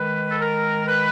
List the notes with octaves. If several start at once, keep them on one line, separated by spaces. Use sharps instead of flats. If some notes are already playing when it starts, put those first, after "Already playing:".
Already playing: D#3 G#3 B4
A4
A#4
B4